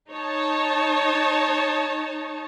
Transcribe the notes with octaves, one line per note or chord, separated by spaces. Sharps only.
D#4 C#5 A5